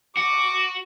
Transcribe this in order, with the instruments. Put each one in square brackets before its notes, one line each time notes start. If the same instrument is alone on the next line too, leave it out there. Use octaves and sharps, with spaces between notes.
[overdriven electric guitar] F#4 [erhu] D6